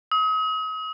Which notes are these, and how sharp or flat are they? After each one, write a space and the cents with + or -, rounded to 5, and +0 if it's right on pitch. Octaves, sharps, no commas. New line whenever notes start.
D#6 +40